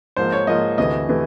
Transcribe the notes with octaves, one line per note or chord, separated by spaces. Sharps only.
G#2 F3 A#3 C5
C#5
G#2 F3 A#3 D#5
D2 C3 E3 A3 D#5
C3 E3 A3